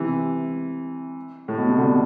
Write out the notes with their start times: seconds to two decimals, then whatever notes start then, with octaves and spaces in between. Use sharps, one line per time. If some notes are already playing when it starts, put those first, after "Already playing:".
Already playing: C3 E3
1.48 A2
1.58 B2
1.68 C3
1.78 B2 D3